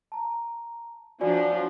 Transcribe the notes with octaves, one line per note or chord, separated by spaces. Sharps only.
A5 A#5
F3 F#3 D4 F#4 D5 G#5